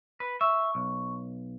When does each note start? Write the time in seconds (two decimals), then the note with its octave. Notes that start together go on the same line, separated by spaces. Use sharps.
0.20 B4
0.41 E5 C#6
0.75 B1